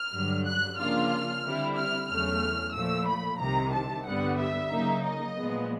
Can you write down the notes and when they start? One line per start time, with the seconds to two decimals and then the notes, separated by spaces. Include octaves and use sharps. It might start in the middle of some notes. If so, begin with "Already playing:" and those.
Already playing: F6
0.13 G2 D3 F#3
0.45 F#6
0.78 C#3 F3 A#3 D4 F4 F6
1.44 D3 G3 C4 E4
1.76 F6
2.09 E2 C#3 F#3 A3 F6
2.74 A#2 F3 A3 E6
3.07 B5
3.40 C2 C3 D#3 A#5
3.73 A5
4.06 G2 D3 G3 B3 F#5
4.39 E5
4.71 C#3 F#3 A#3 D#4
5.04 D#5
5.37 A#2 F3 G#3 B3